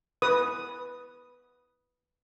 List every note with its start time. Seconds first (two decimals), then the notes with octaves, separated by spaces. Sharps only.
0.22 B4 D#6